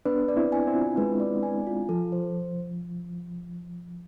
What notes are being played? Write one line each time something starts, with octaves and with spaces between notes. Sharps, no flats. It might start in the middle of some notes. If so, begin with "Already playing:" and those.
B3 D4 B4
D5
C4 E4
G#5
C4 E4
F4
G#3 B4
D5
G#5
F4
F3 A4
C5